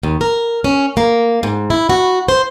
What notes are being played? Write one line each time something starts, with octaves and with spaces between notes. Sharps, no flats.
D#2
A#4
C#4
A#3
G#2
E4
F#4
C5